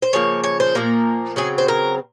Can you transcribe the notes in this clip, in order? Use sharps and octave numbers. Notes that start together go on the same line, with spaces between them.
C5
C#3 F3 A#3 C#5
C#5
C5
A#2 F3 A#3 A#4
C#3 F#3 C4 G#4
C5
A#4